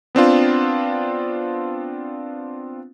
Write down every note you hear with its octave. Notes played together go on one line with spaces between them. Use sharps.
B3 C4 D4 F4